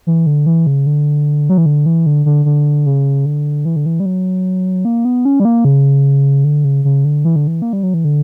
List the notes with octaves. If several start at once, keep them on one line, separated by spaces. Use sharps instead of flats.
E3
D3
E3
C#3
D3
F#3
E3
D3
E3
D3
D3
D3
C#3
D3
E3
D3
E3
G3
F#3
A#3
B3
C#4
G3
A#3
C#3
D3
C#3
C#3
D3
E3
D3
E3
A#3
G3
F#3
E3
D3